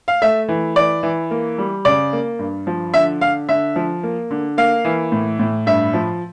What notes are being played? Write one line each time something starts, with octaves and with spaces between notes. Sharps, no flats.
F5
A3 E5
E3
E3 D5
E3
A#3
G3
C#3 D5
A#3
G2
F3
D3 E5
D3 F5
D3 E5
F3
A#3
D3
A#3 F5
E3
A2
A2
G2 E5
F3